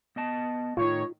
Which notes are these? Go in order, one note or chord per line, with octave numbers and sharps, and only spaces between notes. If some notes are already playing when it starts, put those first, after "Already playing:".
B3 D#5 A5
A2 D#3 F4 C#5